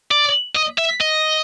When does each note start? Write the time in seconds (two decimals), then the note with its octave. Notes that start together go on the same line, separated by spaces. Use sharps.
0.11 D5
0.56 D#5
0.78 E5
1.01 D#5